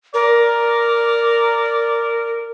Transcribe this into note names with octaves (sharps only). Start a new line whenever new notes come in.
A#4 D5